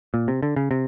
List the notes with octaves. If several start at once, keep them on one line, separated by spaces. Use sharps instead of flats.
A#2
C3
D3
C#3
C3